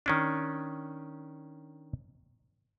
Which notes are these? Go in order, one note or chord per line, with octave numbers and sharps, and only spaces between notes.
D#3 C#4 D4